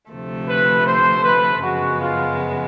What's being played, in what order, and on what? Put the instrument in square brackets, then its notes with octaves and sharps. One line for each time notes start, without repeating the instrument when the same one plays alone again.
[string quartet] D2 C3 F3 A3
[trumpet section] B4
C5
B4
[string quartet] F#2 C#3 F3 G#3 B3 [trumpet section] F#4
[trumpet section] F4